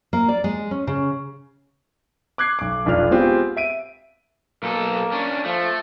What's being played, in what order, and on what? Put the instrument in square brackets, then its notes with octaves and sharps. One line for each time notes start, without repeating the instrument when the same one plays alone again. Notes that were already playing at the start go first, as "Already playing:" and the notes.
[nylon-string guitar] A#3
D5
G#3
C#4
C#3
[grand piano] D6 F#6 G#6 C7
B1 D6
F1 B1 D4 F4 F6
G#3 B3 C4 F4 G4
E5 D7 D#7
[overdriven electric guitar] B1 A4 [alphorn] A#3
[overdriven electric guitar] C#4 D4
[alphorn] F3 [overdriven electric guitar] A3